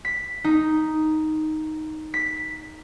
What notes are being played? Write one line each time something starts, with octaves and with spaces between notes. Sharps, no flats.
B6
D#4
B6